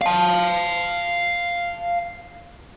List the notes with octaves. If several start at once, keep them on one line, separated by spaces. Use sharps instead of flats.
F5 A5